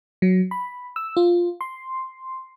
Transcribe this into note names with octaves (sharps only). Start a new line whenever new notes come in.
F#3
B5
E6
F4
C6